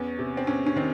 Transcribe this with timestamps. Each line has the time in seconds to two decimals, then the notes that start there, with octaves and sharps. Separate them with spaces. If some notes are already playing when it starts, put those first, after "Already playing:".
Already playing: E2 C#4
0.19 C3
0.37 C4
0.47 E2 C#4
0.66 C#4
0.76 D#3 C4